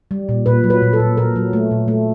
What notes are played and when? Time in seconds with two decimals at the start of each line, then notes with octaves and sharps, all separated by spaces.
0.11 G3
0.29 A#2
0.46 A#2 B4
0.64 F#3
0.70 B4
0.82 A#2
0.93 A4
1.00 A#2
1.17 A#2 A#4
1.36 F#3
1.53 A3
1.71 A#2
1.88 A3